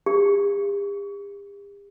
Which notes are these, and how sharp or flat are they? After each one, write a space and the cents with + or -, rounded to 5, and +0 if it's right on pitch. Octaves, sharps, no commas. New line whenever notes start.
G4 +45